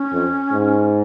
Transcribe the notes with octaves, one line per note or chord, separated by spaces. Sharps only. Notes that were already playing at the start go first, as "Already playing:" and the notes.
Already playing: C#4
F2
G#2